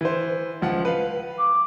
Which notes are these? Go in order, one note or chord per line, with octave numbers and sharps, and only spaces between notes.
E3 C5
C#2 F3 F#5
B4 F5
D6